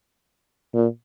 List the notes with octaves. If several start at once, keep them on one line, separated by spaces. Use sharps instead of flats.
A#2